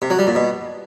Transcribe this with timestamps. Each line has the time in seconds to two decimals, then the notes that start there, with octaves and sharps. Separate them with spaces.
0.02 C3
0.10 F#3
0.19 G3
0.27 A#2
0.35 B2